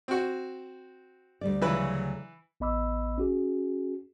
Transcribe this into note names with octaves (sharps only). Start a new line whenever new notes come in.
C4 F#4
D2 G3 D5
C#3 E3 F#3 B4
A1 B3 D#5 B5 D6 E6
C#4 F#4 G#4